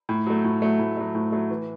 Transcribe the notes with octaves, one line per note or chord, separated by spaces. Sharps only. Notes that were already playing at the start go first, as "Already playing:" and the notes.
A2
F#3 A3
A2
F#3 A3
A2
F#3 A3
A2
F#3 A3
E3